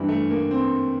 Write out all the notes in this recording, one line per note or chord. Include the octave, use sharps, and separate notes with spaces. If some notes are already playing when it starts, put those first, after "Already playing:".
Already playing: G2 E3 G3
A3
A#3
C4